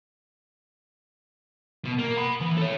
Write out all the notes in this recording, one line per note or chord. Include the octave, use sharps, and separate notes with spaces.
B2
A#3
F#5 B5
E3
A4 C#5